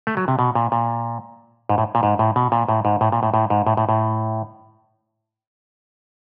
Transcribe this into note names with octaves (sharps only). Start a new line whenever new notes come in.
A3
F#3
C3
B2
A#2
A#2
G#2
A2
A#2
G#2
A2
B2
A#2
A2
G#2
A2
A#2
A2
A2
G#2
A2
A2
A2